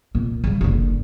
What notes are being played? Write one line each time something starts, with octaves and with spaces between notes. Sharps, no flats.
A#2
C#3 G3
F#1 D3